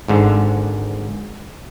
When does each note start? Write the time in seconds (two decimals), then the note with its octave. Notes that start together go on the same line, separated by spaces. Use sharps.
0.08 G#1 G#2 D3